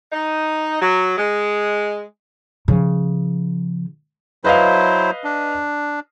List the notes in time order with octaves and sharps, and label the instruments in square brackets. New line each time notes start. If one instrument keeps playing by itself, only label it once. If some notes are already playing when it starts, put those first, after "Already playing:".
[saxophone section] D#4
F#3
G#3
[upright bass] C#3 F3
[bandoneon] F#3 E4 C5 [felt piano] B4 D#5 F5
[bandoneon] D4